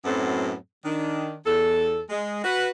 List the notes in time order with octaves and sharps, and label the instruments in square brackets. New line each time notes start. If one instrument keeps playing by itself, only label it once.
[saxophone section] F#2 A2 F#3 B3 C4 A4
D#3 D4
E2 A4
G#3
F#4 B4